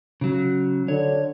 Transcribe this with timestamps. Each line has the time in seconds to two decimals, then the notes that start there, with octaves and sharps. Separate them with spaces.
0.21 C#3 F#3
0.88 D3 C#5